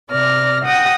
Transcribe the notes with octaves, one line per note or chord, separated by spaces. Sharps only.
C3 D5 F6 A#6
F#5 G5 D#6 A#6